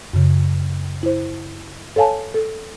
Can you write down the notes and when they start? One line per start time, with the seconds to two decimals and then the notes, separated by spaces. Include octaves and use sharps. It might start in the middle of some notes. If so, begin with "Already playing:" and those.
0.13 F#2 C#3
1.03 E4 C5
1.96 A4 C#5 F5 G#5 A5
2.34 A4